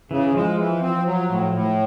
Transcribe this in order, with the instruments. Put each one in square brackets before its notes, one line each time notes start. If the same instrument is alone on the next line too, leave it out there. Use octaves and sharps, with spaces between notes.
[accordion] C#3 [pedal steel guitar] E3
[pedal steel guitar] F3 [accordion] G#3
[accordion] E3
C4
F#3
A2
A2